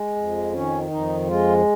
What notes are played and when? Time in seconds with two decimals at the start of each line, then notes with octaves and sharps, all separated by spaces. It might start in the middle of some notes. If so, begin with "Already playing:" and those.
Already playing: G#3
0.16 F2
0.53 D#3 C#4
0.91 F2 D#4
1.28 G#3 F4